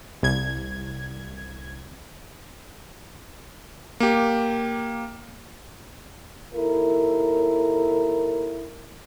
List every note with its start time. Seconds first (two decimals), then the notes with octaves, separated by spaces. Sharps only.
0.23 C2 G#6
4.00 A#3 G4
6.53 D#2 E4 A4 A#4